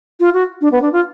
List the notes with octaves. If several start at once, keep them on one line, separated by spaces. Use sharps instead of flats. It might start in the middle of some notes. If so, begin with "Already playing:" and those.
F4
F#4
D4
B3
D4
F4